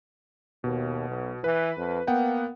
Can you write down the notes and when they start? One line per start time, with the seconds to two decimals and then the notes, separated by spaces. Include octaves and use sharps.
0.64 D#2 B2
1.08 B1
1.44 E3 B4
1.77 F2
2.07 A#3 B3 F#5 G5